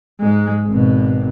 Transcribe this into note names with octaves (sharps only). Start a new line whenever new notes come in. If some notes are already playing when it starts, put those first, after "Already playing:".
G#2 G#3
G#1 B2